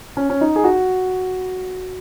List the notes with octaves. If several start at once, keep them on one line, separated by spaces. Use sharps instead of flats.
C#4
C#4
D#4
G#4
F#4